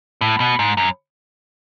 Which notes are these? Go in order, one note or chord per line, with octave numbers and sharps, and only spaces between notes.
A2
B2
G#2
F#2